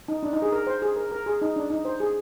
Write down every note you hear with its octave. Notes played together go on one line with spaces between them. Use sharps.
D#4
D4
D#4
G#4
A#4
C5
G#4
A#4
A#4
G#4
D#4
D4
D#4
C5
G#4